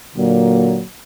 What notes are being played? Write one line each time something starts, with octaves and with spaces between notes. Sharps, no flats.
A#2 D3 F#3 A#3